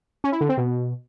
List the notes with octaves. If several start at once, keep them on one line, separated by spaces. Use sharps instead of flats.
C#4
E4
D3
C4
B2